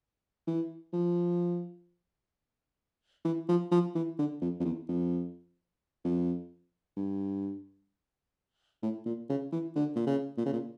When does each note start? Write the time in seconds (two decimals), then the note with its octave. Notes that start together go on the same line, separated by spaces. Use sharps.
0.47 E3
0.93 F3
3.25 E3
3.48 F3
3.72 F3
3.95 E3
4.18 D3
4.41 F2
4.60 F2
4.65 E2
4.88 F2
6.04 F2
6.97 G2
8.82 A2
9.06 A#2
9.29 C#3
9.52 E3
9.76 D3
9.95 A#2
10.07 C#3
10.37 A#2
10.46 C#3
10.53 A#2